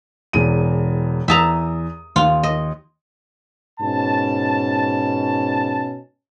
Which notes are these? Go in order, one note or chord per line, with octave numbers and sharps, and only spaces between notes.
E1 E2 D#7
E2 E5 A5 A#5 D#6
D#2 F4
D#5
G#2 B2 C#4 A5